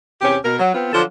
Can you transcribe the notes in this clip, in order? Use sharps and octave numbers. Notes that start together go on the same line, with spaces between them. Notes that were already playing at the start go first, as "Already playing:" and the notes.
E2 C3 C#4 G4
B2 A#4
F#3
B3 C4 F4
D3 F3 F#3 D4 F4 A4